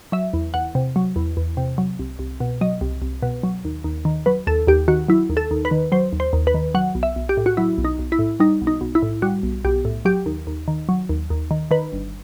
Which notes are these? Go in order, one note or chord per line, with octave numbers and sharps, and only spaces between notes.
F#3 E5
E2
E2 F#5
C3
F#3
E2
E2
C3
F#3
C2
C2
B2
F#3 D#5
C2
C2
B2
F#3
D#2
D#2
D#3
F#3 B4
D#2 A4
D#2 G4
D#3 F#4
F#3 E4
D#2
A4
D#2
B4
D#3
F#3 C5
D#2
C5
D#2
B4
D#3
F#3 F#5
B1
E5
B1
G4
A2
F#4
F#3 E4
B1
D#4
B1
E4
A2
G3 D#4
B1
D#4
B1
E4
A2
G3 F#4
B1
B1 G4
A2
F#3 G4
D#2
D#2
D#3
F#3
D#2
D#2
D#3
D#3 B4
G1